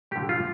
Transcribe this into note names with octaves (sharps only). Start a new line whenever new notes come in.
D3 A3 G4
F4